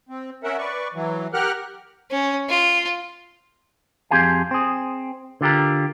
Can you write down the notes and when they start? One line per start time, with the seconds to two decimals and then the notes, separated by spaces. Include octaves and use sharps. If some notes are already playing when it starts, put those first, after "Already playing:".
0.09 C4
0.43 C#4 A#4 E5 F#5
0.58 B4 D5 C#6
0.94 E3 F#3
1.34 G4 A#4 F#5 F6 F#6
2.11 C#4
2.49 F4
4.11 F2 C4 G4 G#4 F5 G#5
4.51 C4 G#4
5.41 D3 F4 G4 A#4